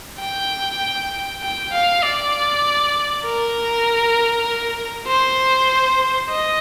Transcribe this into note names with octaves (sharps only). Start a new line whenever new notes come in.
G5
G5
F5
D5
A#4
C5
D#5